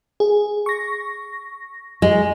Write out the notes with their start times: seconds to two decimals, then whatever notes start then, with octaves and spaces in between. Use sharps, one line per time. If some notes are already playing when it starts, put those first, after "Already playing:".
0.20 G#4
0.66 C#6 A#6
2.02 G#3